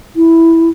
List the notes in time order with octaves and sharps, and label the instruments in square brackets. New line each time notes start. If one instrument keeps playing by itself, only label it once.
[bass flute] E4